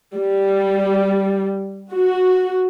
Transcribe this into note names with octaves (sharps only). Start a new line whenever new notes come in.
G3
F#4